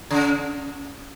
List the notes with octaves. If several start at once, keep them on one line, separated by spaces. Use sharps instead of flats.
C#3